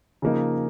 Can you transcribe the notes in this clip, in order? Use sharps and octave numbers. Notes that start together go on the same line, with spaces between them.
C#3 F3 A#3 D#4